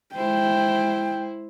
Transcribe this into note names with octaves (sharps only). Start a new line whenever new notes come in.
G#3 E4 C5 G5